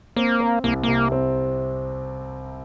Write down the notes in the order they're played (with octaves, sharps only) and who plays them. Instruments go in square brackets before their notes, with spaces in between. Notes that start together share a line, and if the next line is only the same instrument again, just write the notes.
[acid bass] A#3 [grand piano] C4
[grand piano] C4
[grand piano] C2 [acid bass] A#3
[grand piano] C3 [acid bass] A#3
[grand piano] C4